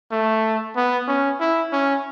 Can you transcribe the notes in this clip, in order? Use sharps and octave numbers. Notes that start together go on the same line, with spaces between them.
A3
B3
C#4
E4
C#4